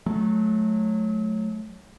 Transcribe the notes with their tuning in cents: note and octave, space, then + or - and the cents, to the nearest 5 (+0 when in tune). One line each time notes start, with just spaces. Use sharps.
F#3 -15 A3 -20